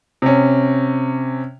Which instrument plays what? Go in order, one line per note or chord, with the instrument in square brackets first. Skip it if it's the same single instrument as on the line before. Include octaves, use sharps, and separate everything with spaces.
[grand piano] C3 C#4